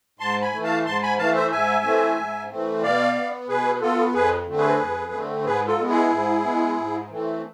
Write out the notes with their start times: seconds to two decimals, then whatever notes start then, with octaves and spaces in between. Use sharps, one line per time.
0.19 G#2 A5 C6
0.42 G#5 B5
0.52 E3 A3
0.64 F5 A5
0.86 G#2 A5 C6
1.02 G#5 B5
1.18 E3 A3 F5 A5
1.35 C5 E5
1.51 G#2 E5 G#5
1.84 E3 A3 C4
2.17 G#2
2.50 E3 A3 C4
2.82 B2 D5 F5
3.15 B3
3.48 B2 G#4 B4
3.81 B3 F4 A4
4.13 F2 G#4 B4
4.46 D3 A3 C4
4.57 G#4 B4
4.80 F2
5.12 D3 A3 C4
5.45 G#2 G#4 B4
5.67 F4 A4
5.79 G#3 B3
5.89 E4 G#4
6.11 G#2
6.44 G#3 B3
6.77 G#2
7.09 E3 A3 C4